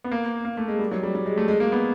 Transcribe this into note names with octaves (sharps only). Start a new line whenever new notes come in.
B3
A#3
A#3
A3
G#3
G3
F#3
G3
G3
G#3
A3
G#3
A#3
B3